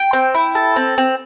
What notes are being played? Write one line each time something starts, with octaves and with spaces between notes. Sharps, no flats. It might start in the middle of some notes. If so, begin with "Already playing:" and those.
Already playing: G5
C4
E4
A4
C4
C4